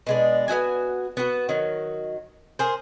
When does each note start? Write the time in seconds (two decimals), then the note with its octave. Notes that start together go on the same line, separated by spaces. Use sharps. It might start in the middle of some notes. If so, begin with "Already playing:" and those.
0.07 B2 G#3 D4
0.48 B3 E4 F#4 G#5
1.17 B3 F#4
1.49 D#3 F#3
2.59 G#4 A#4 C5